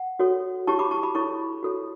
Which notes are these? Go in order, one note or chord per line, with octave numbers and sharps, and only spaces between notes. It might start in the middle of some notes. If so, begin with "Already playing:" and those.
Already playing: F#5
F#4 A4 C#5
E4 G4 C#5 A5 C#6
B5 D6
A5 C#6
B5 D6
E4 A4 C#5 A5 C#6
F#4 A4 C#5